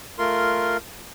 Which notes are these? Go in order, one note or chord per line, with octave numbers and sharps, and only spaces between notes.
A3 F4 A#4 C6